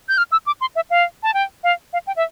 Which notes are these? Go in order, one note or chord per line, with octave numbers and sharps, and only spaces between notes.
G6
F6
E6
D6
C6
E5
F5
A5
G5
F5
F5
G5
E5